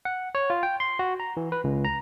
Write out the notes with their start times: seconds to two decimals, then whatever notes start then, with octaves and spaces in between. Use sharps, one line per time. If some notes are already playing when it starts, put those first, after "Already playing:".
0.05 F#5
0.35 C#5
0.50 F4
0.63 G5
0.80 C6
0.99 F#4
1.20 A#5
1.37 E3
1.52 B4
1.64 C#2
1.85 A#5